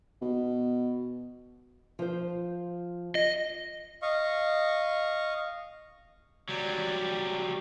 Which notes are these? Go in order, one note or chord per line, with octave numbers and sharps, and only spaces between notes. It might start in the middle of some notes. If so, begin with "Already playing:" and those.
B2
F3 C5
D#5
D#5 F5 C#6
F#3 G3